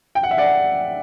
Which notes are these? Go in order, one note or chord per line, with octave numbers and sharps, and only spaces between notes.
G5
F#5
E5
D5 F#5